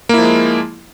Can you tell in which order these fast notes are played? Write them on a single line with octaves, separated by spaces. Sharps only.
A#3 E4 F3 G#3